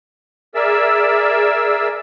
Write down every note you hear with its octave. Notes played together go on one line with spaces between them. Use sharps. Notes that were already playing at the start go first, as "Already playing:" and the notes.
G#4 A#4 D5 E5 E6